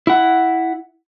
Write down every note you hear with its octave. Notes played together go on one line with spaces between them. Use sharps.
E4 F#5